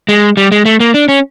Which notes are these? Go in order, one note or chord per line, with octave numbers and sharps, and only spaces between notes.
G#3
G3
G#3
A3
A#3
D4
C#4